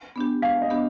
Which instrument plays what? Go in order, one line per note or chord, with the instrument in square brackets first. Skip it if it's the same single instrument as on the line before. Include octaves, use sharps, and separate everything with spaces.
[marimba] B3 D4 G4
[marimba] G#3 [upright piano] F5
[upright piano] D#5
[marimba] B3 D4 G4